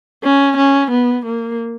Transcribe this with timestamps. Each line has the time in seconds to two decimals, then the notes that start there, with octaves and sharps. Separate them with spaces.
0.23 C#4
0.57 C#4
0.91 B3
1.25 A#3